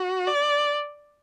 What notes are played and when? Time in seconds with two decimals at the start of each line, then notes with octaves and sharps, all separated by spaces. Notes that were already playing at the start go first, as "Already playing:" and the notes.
Already playing: F#4
0.27 D5